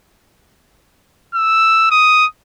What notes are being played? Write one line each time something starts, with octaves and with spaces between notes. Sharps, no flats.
E6
D#6